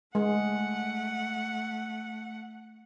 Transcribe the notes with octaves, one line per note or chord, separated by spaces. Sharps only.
G#3 A3 F#5